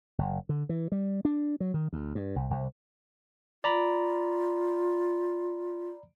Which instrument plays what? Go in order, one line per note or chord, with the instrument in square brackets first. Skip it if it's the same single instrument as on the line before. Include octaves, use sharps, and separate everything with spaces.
[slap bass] F#1
D3
E3
G3
D4
F#3
D#3
D2
G2
C2
C2
[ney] F4 [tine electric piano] D5 A#5 B5